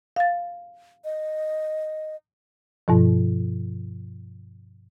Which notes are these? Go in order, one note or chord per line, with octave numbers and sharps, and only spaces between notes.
F5 A6
D#5
G2 B2 F3